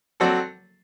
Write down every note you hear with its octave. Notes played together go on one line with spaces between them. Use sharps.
F#3 C4 F#4 A4 D5